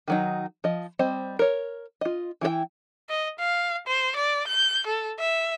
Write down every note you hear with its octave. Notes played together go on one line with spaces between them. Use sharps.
D#3 F#3 D#4
F3 D#5
G3 C4 C5 D#5
A#4 C#5
F4 D#5
E3 E4 G#4 G5
D#5
F5
C5
D5
G6
A4
E5